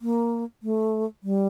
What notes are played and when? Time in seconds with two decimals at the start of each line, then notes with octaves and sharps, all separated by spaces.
0.02 A#3
0.63 A3
1.23 G3